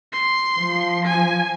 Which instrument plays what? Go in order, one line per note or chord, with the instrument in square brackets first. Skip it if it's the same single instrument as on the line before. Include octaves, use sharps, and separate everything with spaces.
[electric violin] C6
[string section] F3
[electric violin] G#5